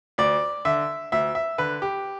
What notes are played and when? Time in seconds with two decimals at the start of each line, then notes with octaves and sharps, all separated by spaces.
0.18 D2 D5
0.65 D3 E5
1.12 D2 E5
1.35 E5
1.58 D3 B4
1.82 G4